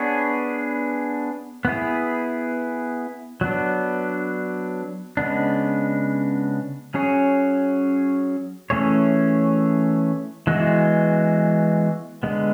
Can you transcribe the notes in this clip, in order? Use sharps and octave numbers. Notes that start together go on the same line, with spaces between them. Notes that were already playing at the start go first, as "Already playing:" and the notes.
Already playing: B3 D4 G#4 C#5
B3 E4 G#4
F#3 B3 D4
C#3 G#3 B3 D4
F#3 C#4 G#4 C#5
E3 A3 C#4 G#4 C#5
E3 G#3 B3 F#4
D3 G#3 B3